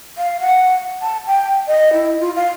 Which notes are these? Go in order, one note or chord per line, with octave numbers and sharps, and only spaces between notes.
F5
F#5
A5
G5
D#5
E4
F4
F5